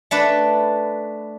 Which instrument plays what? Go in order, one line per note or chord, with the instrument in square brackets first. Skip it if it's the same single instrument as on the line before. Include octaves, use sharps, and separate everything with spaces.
[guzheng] A3 D4 B4